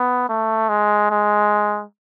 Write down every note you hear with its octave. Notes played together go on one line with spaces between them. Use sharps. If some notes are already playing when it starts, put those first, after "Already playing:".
Already playing: B3
A3
G#3
G#3